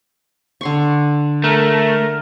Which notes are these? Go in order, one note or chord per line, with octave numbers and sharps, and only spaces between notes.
D3 C6 C#6
A3 A#4